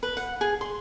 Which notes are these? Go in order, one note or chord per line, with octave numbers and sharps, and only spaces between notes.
B4
F#5
G#4
C6